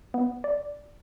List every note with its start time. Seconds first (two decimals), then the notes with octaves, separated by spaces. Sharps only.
0.14 B3
0.44 D5